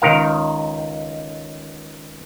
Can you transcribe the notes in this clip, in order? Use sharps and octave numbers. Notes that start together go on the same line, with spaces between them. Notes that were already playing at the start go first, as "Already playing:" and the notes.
C#2 D#3 A#4 F5